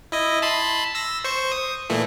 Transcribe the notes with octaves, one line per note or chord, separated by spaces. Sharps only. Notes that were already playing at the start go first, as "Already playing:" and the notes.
E4 D#5
A5 B5 C6
E6 A#6
C5 C#6
D#6
A#2 E3 A3